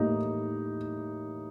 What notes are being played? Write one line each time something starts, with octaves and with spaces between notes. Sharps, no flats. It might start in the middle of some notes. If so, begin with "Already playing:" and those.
Already playing: A2 G3 A#3 D#4